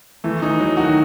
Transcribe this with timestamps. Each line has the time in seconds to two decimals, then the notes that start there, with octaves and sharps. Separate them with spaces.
0.24 E3 A3
0.42 E3 D#4
0.60 F#3
0.77 D#3 F#4